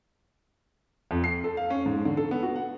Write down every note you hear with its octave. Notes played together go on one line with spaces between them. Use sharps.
F2
C7
A4
F5
C#4
G#2
D3
A4
B3
F#4
F#5